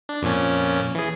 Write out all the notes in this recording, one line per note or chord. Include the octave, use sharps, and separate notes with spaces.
D4
F2 A#2 C#4
E3 G#4